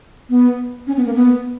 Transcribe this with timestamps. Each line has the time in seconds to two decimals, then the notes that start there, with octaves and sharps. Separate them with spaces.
0.29 B3
0.87 C#4
0.97 B3
1.06 A#3
1.15 B3